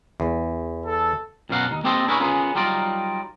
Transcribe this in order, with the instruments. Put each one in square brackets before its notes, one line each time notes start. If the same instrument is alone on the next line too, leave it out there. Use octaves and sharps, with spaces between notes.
[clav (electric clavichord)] E2
[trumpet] A4
[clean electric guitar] F#2 B2 F#3 F5 F#5 A#5
D#2 D#4
A#3 C4 G4 A4 C5 D#5
D4 E4 G#4 A#4 B4 C#5
B3 C#4 F4 G#4 A#4 B4
F#3 G3 D#4 F4 A#4 D5